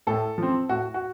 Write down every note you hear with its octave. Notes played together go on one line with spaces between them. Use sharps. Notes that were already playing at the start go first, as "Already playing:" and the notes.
A2 A4
F3 C4
A2 F#4
F#4